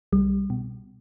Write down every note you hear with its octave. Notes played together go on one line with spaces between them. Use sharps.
C2 G3
B2